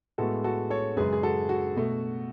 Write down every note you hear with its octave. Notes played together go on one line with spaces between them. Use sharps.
A2 G#3 B3 F#4 A4
F#4 A4
A4 C#5
F#2 C#3 G#3 G#4 B4
G#4
F#4 A4
F#4
B2 A3